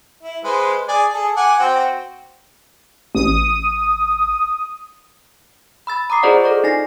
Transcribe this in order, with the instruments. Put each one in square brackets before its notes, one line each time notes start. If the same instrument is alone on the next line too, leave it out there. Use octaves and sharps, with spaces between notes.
[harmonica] E4
G#3 B4 C5
G#4 D5 G#5
G#4 A4
F#5 G#5 D6
C4 F#4 G5
[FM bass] A1 [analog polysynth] D#6
[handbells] B5 E6 A6
A#5 D6 D#6 C7
F4 G#4 C5 D5 D#5 F#5
A4 D5 C#6
D#4 G#5 A#6 C7